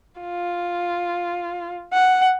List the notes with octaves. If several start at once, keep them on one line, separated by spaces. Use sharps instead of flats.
F4
F#5